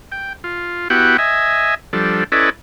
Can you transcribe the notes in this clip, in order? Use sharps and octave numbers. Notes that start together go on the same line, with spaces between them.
G5
F4
B3 E4 F#4 G4 F#5 G5
D#5 E5 G#5
F3 G3 D4 A4
C#4 E4 A4 B4 D5 D#5